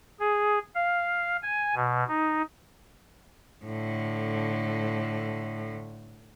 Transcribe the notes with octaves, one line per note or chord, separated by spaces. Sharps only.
G#4
F5
G#5
B2
D#4
A2 D3